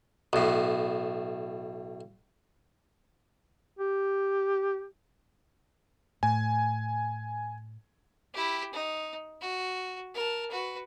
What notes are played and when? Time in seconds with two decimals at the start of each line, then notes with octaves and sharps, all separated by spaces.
0.33 B1 A2
3.79 G4
6.23 A2 G#5
8.34 E4 G4
8.73 D#4
9.41 F#4
10.15 A#4 A5
10.50 F#4 B4